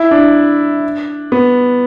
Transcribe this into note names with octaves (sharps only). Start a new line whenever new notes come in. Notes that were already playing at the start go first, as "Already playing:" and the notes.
Already playing: E4
D4
B3